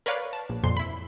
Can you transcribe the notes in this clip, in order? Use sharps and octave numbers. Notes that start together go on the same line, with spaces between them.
A#4 B4 C#5 D5 F5
A5
A#1
F2 A#2 C6
E4 B5